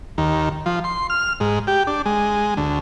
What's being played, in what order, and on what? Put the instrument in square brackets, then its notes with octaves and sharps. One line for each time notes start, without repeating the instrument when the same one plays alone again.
[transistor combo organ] D#2
F3
C6
F6
G#2
G4
D4
G#3
D2